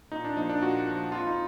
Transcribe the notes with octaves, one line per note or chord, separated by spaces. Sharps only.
A#2 D#4
D4
F3 A#3 D#4
D4
A#2 F#4
F3 A#3
F2 F4
D#4